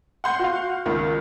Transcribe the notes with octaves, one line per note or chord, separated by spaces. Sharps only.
F#5 C6 G6
F#4 F5
C#2 D#3